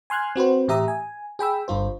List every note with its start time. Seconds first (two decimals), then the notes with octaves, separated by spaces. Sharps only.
0.10 G#5 C6 F6 F#6 G#6
0.36 C4 F#4 B4 C5
0.68 A2 E3 G4 E5 A#5 D#6
0.88 G#5
1.39 G#4 G5 B5 E6
1.68 G1 G2 F4 C5